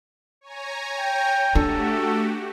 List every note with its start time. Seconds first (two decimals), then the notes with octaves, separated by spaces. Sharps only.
0.41 C#5 G#5 A#5
0.97 G5
1.55 A3 D4 F#4 G4 A4